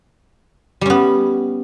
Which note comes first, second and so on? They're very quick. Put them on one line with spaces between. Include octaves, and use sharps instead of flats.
G3 C#4 B3